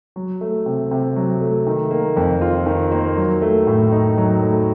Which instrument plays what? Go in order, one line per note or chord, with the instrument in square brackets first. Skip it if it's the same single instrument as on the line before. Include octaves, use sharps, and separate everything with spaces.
[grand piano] F#3
A3
C3
C3
F#3
A3
D#3
A#3
F2
F4
D#3
A#3
F#3
A3
A2
D#4
F#3
A3